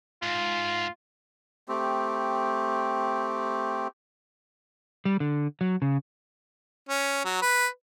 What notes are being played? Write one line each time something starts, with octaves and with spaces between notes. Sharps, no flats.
G#2 F4
A3 C4 G4
G3
D3
F#3
C#3
C#4
F#3
B4